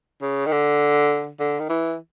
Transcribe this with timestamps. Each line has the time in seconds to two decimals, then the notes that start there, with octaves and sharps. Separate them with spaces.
0.21 C#3
0.46 D#3
0.52 D3
1.39 D3
1.60 D#3
1.69 E3